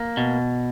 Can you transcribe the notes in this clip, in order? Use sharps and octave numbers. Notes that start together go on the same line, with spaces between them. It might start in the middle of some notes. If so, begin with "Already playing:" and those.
Already playing: A#3
B2